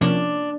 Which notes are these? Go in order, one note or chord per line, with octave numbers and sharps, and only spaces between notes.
C3 F3 A#3 C#4 D4